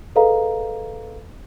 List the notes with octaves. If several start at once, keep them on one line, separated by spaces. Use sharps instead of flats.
G#4 A4 B4 D#5 F5 A#5